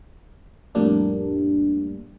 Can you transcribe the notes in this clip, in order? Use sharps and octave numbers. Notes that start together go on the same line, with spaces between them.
F2 A2 G3 A#3 D4